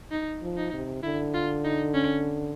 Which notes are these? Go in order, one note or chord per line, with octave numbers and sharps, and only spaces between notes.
D#4
F3
D#4
C3
D3 E4
F4
D#4
C#4